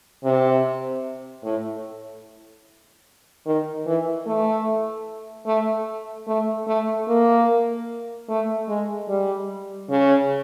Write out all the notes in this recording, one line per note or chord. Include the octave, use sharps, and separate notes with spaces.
C3
A2
D#3
E3
A3
A3
A3
A3
A#3
A3
G#3
G3
C#3